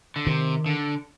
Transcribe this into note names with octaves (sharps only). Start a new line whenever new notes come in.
D3
C3 D#3
D3